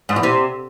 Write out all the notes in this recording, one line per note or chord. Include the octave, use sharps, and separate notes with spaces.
G#2
E2
C3